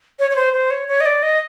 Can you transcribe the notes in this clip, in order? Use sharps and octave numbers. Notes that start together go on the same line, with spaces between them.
C#5
C#5
C5
C5
C#5
C#5
D#5
D5
D#5